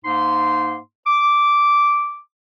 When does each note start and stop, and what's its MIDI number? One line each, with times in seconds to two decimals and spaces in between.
0.05 0.76 44
0.05 0.76 58
0.05 0.76 63
0.05 0.76 84
1.06 2.20 86